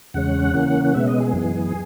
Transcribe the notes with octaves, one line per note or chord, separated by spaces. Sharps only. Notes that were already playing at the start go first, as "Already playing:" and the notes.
E2 C#3 G#3 C#4 F#5
C#3 E3 A#3 C#4
F#5
B2 G#3 B3 E5
D#5
G#4
F#2 E3 B3